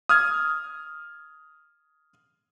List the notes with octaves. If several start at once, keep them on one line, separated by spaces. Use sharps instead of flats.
D#6 F6 G#6